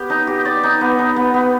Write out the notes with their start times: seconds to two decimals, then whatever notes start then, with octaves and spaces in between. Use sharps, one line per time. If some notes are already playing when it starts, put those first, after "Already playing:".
Already playing: B3 G4
0.10 D#4
0.27 G4
0.45 D5
0.63 D#4
0.81 B3
0.99 D#4
1.16 B3
1.34 B3